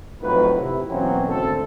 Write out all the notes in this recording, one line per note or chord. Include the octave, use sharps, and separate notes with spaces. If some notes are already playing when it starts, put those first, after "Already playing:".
F2 A2 D#3 F#3 B4
C3 E4
B2 E3 F#3 A#3 C4 C#4
G#1 D2 C4 A4